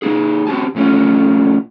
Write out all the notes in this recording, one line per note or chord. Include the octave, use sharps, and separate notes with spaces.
A#3 D#4 G#4
C4 F#4 G4 A5
A#2 A3 C#4 F4